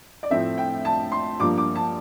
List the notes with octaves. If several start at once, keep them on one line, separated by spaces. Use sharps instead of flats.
D5
A2 F3 A3 C4 E5
G5
A5
C6
G2 F3 A#3 D6
D6
A5